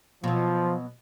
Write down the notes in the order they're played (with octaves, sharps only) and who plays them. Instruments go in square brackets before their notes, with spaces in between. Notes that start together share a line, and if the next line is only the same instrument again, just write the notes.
[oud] B2 F#3 [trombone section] F3